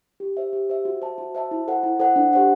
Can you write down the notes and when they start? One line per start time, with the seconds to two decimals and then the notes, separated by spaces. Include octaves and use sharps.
0.20 G4
0.37 C5 E5
0.53 G4
0.70 C5 E5
0.85 F#4
1.02 C5 E5 A5
1.18 F#4
1.35 C5 E5 A5
1.51 E4
1.68 A4 C5 F#5
1.83 E4
2.00 A4 C5 F#5
2.16 D4
2.33 G4 C5 F#5